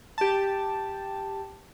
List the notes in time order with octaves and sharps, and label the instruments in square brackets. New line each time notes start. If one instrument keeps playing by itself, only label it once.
[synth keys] G4 A5